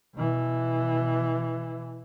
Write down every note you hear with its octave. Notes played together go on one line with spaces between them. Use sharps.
B2 E3